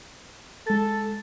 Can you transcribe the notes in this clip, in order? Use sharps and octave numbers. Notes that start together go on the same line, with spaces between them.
G#3 A4 A6